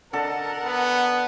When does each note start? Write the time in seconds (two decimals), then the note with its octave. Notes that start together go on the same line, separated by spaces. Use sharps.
0.13 D3 A4 A#4 D#5 F#5
0.65 B3